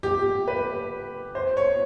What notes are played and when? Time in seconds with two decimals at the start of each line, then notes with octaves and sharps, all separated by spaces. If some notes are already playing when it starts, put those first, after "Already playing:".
0.03 G4
0.48 B4
1.35 C5
1.57 C#5